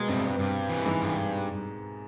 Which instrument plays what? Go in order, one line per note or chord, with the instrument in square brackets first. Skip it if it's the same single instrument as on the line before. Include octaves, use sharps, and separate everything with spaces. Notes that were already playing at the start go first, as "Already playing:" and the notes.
Already playing: [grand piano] B2 A#3 B3 [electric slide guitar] G#3
[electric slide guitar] G2 [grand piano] C3 C4
[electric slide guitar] G2
E3
[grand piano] G#2 G#3
[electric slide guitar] G2